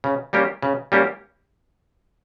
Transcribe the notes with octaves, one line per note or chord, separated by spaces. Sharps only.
C#3
G3 A#3 C#4 G4
C#3
G3 A#3 C#4 G4